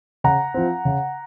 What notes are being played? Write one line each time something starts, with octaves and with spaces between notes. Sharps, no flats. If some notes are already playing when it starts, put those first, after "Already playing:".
C#3 F#5 A#5
F3 C4
C#3